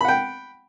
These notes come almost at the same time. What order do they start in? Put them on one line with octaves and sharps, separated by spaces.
B5 F#5 G5